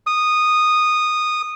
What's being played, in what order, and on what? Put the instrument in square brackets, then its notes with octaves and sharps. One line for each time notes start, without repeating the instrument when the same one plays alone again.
[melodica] D#6